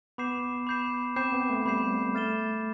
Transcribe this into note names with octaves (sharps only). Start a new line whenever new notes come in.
B3 B5 D6 G6 C7 E7
B5 D6 G6 C7 E7
C4 B5 D6 G6 C7 E7
B3
A3
G3 B5 D6 G6 C7 E7
A3 F6 A6 E7 G7